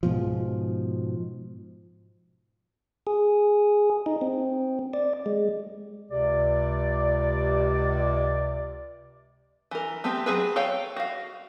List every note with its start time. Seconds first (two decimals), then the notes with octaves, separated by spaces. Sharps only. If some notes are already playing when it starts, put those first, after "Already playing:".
0.03 G#2 B2 F3
3.07 G#4
4.06 D#4
4.21 C4
4.94 D5
5.26 G#3
6.11 C#2 C3 D5
9.71 E3 A#4
10.04 A3 B3 C4 G4
10.26 F#3 C4 G#4 B4
10.56 A4 C#5 F5 G5
10.96 F#4 F5